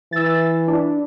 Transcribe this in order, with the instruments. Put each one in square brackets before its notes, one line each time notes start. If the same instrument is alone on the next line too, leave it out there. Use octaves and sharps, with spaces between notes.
[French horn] E3 [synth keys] E6 A6
[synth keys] D4 E4